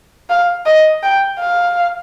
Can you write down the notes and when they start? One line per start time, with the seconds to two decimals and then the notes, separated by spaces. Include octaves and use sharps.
0.30 F5
0.66 D#5
1.03 G5
1.39 F5